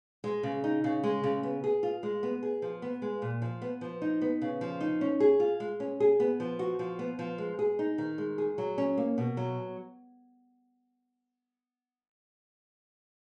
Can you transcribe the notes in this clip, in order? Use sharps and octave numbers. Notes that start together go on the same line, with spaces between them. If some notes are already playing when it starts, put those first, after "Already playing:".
G#3
C#3
D#4
C#3
G#3
C#3
B3
G#4
F4
G#3
B3
G#4
F3
B3
G#3
A#2
F3
B3
F3
D#4
B3
C#3
F3
D#4
C#4
G#4
F4
G#3
C#4
G#4
B3
F3
F#4
F3
B3
F3
G#3
G#4
D#4
D#3
G#3
G#4
F#3
C#4
A#3
B2
F#3